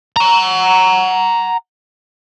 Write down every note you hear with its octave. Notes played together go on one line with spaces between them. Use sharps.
F#5 A#5